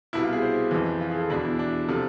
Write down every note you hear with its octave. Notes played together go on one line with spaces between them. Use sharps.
C2 B2 E4
F4
G#4
C5
F2 E3
F4
G#4
A4
E2 B2 D4
E4
D4
C3 F3 A4